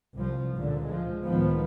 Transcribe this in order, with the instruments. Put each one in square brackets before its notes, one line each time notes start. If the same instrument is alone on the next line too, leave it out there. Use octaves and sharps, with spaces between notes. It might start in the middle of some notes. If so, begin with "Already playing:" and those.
[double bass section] C2 F3
C#2 A#2 D3
F3 G#3
C#2 A2 D#3 F3 B3